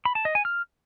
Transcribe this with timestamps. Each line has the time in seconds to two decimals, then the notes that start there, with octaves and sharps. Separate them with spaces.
0.05 B5
0.15 A5
0.25 D#5
0.35 G#5
0.45 F6